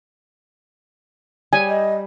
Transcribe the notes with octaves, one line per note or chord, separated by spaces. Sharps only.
G3 G#5
D#5